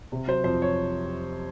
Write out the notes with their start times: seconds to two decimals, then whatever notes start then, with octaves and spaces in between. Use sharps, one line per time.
0.12 C3
0.28 F#3 C5
0.44 F2 C5
0.62 C#5